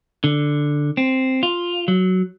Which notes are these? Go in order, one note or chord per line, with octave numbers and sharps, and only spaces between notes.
D3
C4
F4
F#3